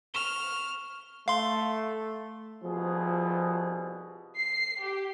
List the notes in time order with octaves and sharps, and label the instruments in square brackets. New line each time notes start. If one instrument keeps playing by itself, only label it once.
[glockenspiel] C#6 E7 G7 [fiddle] F6
[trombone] A3 [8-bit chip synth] F5 C6
[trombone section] C2 B2 G#4 [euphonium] F3
[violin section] C7
G4